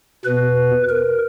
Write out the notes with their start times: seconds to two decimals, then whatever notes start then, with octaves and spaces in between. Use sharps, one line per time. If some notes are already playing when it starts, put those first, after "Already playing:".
0.25 E2 B2 B4
0.89 A#4